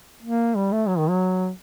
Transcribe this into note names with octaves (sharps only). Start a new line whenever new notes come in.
A#3
G3
A3
F#3
D#3
F#3